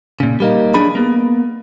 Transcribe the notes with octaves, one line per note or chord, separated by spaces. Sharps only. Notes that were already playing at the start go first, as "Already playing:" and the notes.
A#2 C#3
G3 A#3 D#4
F#3 D4 G#4 B5
A#3 B3